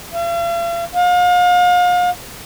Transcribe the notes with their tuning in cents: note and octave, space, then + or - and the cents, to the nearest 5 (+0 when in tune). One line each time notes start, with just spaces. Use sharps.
F5 -45
F5 +35